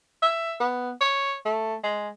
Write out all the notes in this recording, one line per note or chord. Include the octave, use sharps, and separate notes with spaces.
E5
B3
C#5
A3
G#3